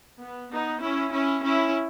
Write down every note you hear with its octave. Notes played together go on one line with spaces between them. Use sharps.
B3
B3 D#4
C#4 E4
C#4 E4
C#4 E4